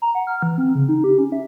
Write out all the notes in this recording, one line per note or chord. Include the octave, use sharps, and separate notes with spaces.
A#5
F#5
F6
E3
C4
C#3
D#4
G4
C#4
E5